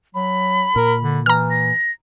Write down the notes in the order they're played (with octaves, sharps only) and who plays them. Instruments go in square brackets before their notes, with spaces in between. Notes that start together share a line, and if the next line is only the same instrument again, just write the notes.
[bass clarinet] F#3 [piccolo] B5
[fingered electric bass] A#2 [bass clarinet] A#4
[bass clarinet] D3
[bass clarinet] E3 [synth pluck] A#5 F6
[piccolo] A#6